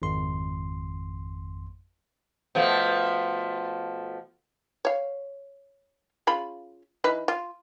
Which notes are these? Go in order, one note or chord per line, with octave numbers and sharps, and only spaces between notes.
G#1 F2 C6
B2 F3 A3
C#5 F5
C#3 F4 B5
E3 D#4 B4
F4